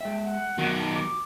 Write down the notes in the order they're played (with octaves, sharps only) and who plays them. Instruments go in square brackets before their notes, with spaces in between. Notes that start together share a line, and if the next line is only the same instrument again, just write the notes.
[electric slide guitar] G#3 E5 [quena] G5
[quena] F#5
[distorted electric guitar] B1 D#3 [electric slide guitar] F#4
[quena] A5
D6